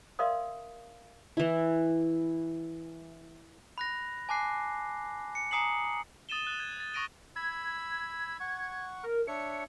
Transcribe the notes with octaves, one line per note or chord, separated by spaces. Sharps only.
A#4 D5 E5 F5 C6 D#6
E3 E4
B5 F#6 A#6
G#5 A5 D6 F#6 C7
C#7
G#5 A#5 D#6 C7 C#7 F#7
D#6 A6 D#7 E7 G7
F#6 A6
G#6
A6
C#6 D#6 A#6 D7 D#7 G7
B5 E6 G#6
F#5 C#6
A#4
D4 C#5 E5 C#7